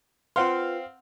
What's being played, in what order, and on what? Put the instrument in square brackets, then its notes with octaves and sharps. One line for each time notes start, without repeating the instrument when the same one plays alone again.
[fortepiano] C4 F5 [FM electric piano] F4 B4 [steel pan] F#5 C6